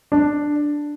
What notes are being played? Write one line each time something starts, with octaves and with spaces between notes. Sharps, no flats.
D4